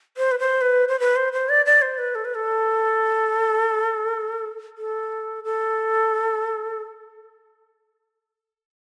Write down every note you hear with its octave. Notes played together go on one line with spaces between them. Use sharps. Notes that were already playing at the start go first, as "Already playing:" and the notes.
C5
B4
C5
B4
C5
B4
C5
C5
D5
D5
C5
B4
A4
B4
A4
A4
A4